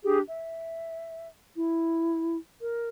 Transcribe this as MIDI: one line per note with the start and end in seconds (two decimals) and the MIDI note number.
0.05 0.20 62
0.05 0.20 67
0.05 0.20 68
0.27 1.28 76
1.56 2.37 64
2.61 2.88 70